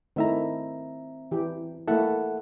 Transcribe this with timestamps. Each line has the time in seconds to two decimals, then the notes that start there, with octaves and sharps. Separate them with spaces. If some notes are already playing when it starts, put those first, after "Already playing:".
0.16 D#3 A3 C4 E4 E5 A#5
1.31 E3 G4
1.88 A3 A#3 E4 A4 E5 F#5